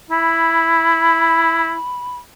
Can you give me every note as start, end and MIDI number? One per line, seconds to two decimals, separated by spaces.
0.10 1.76 64
0.10 2.17 83